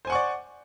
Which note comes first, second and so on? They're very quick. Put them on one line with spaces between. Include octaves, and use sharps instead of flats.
C5 G#5 F#5 C#6 D5